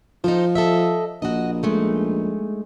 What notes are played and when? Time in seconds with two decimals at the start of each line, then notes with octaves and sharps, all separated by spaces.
0.24 F3 D#4 A4 C5
0.55 A4 D#5 E5
1.22 A#1 F#4 D#5
1.63 G#3 A3 D#4